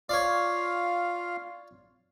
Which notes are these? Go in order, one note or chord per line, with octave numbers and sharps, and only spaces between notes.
F4 C#5 D5 F5